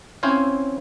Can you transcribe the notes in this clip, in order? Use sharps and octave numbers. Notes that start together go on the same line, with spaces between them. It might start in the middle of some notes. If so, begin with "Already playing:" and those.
C4 C#4 E4 C5 C#5 F5